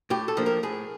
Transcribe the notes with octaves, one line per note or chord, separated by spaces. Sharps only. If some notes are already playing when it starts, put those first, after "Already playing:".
A2 G4
A4
F3 A#3 D4
A#4
A2 G#4